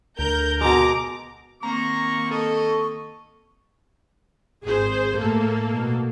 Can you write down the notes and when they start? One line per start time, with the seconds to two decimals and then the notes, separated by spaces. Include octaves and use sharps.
0.19 D2 A#4 G6
0.61 B2 G#3 A#5 D6
1.63 D#3 A#3 C4 A#5 C#6
2.31 A4 D#5 C#6
4.65 G#1 G#4 C5
5.17 A2 A3 A#3 A4
5.71 B2